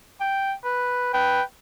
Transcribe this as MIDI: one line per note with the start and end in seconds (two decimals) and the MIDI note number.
0.21 0.53 79
0.64 1.12 71
1.14 1.41 71
1.14 1.43 79